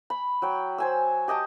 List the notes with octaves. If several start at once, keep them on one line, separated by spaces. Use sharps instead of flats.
B5
F#3 G5
C5 G#5 E6
G4 D#5 G5 A5